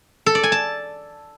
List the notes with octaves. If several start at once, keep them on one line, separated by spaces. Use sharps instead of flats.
A4
D5
G#5
A5